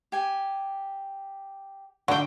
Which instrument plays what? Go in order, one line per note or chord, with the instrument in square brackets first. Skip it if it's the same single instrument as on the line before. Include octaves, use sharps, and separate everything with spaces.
[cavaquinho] G4 G#5
[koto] D3 G5 [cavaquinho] D#4 A4 [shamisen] F#4